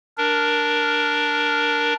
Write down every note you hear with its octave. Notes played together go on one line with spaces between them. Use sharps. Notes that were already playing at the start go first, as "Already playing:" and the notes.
D4 A#4